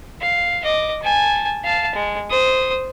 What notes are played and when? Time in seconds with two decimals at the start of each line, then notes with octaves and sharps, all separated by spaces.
0.21 F5
0.64 D#5 D6
1.02 G#5 A5
1.64 F5 A5
1.95 G#3
2.30 C5 D#6